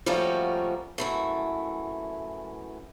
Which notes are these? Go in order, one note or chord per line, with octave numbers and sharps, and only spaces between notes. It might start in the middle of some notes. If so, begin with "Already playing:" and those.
F3 G3 A3 A#3 C#4 F#4
F#2 E3 A3